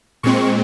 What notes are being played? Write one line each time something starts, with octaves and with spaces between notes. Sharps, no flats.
A#2 G#3 C4 C#6